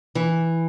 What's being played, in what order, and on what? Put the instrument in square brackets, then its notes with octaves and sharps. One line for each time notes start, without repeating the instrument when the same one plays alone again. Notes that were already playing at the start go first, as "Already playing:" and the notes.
[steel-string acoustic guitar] E3